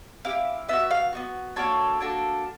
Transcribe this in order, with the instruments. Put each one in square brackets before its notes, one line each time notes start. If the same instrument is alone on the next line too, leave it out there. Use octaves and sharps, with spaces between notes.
[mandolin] C4 E4 G4 F5
B3 D#4 F#4 E5
F5
B3 D#4 F#4
A#3 D4 F#4 A4 C#5
A#3 D4 F#4 A4